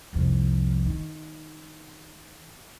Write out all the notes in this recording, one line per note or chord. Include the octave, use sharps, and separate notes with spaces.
C2 F2
D#3